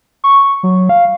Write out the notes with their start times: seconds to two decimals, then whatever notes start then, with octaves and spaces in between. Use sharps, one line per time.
0.24 C#6
0.63 F#3
0.89 F5